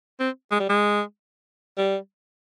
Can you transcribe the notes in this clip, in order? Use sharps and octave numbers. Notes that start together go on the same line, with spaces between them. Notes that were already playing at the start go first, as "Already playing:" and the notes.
C4
G#3
G3
G#3
G3